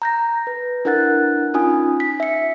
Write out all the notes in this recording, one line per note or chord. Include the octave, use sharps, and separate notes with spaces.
A#5 G6 A#6
B4
D4 E4 A#4 F#5 F#6 A6
C#4 D#4 F4 G#5 D#6
B6
E5 C#7